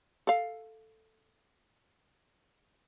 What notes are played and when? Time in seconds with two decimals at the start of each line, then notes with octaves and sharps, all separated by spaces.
0.27 A4 F5